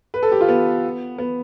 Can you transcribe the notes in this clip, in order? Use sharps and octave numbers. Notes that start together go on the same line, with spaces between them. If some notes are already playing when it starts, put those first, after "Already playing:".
B4
A4
G4
F4
B3
B3